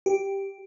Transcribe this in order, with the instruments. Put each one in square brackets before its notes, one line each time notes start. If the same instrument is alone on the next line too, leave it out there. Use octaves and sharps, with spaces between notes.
[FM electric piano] G4